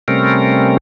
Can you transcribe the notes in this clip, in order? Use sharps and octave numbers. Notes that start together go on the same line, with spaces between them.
C3 G3 A3 C4 C#4 A#4